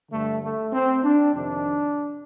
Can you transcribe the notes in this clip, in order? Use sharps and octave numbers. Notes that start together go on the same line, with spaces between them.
G2 D3 A3
A3
C4
D4
F2 C3 D#3 D4